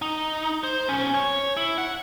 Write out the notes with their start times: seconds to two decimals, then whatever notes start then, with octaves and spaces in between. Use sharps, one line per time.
0.02 D#4
0.64 C5
0.89 B1 C#4
1.14 C#5
1.57 E4
1.78 F#5